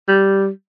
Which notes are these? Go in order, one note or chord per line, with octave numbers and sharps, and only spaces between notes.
G3